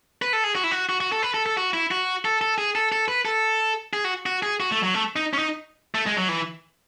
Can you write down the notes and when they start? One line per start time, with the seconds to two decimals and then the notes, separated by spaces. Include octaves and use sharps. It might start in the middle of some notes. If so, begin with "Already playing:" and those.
0.22 B4
0.33 A4
0.44 G#4
0.55 F#4
0.64 E4
0.71 F#4
0.89 F#4
1.00 F#4
1.12 A4
1.23 B4
1.34 A4
1.46 A4
1.57 F#4
1.73 E4
1.91 F#4
2.25 A4
2.41 A4
2.58 G#4
2.75 A4
2.92 A4
3.08 B4
3.25 A4
3.93 G#4
4.04 F#4
4.26 F#4
4.43 G#4
4.60 F#4
4.72 A3
4.83 F#3
4.94 A3
5.16 D#4
5.33 C#4
5.39 D#4
5.95 A3
6.06 G#3
6.17 F#3
6.29 E3